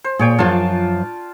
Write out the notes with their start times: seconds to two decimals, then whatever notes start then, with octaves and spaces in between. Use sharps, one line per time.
0.04 C5
0.19 A#2 G#4 C#5 G5
0.38 F#2 F3 D4 F4 A5